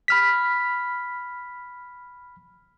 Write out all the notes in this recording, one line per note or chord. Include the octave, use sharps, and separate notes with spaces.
B5 F6 B6